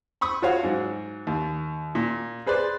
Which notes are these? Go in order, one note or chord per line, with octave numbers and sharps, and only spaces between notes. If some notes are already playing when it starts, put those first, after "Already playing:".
B5 C#6 D#6
F4 F#4 C#5 F5
G#2 F#3
D#2
A#2
G#4 B4 C5 D5